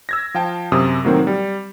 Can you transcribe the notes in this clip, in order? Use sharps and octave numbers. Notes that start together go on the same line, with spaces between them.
E6 G#6 A#6
F3 F5 G5 A5
F#2 C3 D#6
A2 D#3 F#3 A#3 C4
G3